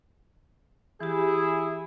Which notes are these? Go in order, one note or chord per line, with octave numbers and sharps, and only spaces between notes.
E3 E4 G4 G#4